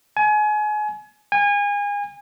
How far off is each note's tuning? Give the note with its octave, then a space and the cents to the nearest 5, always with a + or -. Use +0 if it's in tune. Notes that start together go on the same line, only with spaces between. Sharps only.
G#5 +30
G#5 -30